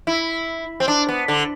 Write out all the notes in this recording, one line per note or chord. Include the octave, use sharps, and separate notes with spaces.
E4
C4
D4
B3
D3